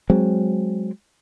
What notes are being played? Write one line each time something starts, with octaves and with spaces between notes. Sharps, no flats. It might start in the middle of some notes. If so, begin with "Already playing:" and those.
F#3 G#3 C4